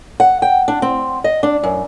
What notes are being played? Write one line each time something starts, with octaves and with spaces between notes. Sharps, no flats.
F#5
G5
D4
C4
D#5
D4
F#2